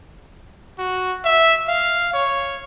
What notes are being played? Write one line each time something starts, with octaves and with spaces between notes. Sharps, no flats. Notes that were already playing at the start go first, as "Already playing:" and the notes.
F#4
E5
F5
C#5